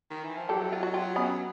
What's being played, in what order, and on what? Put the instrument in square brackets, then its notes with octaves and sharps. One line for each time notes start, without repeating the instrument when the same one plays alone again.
[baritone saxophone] D#3
E3
F3
[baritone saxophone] F#3 [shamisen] G4 A4
[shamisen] E4
F4
F#4
F4 G4
B3 C#4